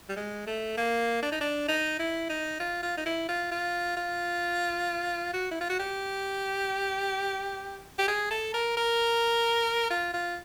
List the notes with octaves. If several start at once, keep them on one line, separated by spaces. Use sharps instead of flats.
G3
G#3
A3
A#3
D4
D#4
D4
D#4
E4
D#4
F4
F4
D#4
E4
F4
F4
F4
F#4
E4
F4
F#4
G4
G4
G#4
A4
A#4
A#4
F4
F4